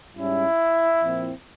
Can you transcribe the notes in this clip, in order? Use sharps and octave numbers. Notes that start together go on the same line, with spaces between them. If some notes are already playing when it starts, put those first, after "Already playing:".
G#2 G3 C#4 E4
A#2 F3 C4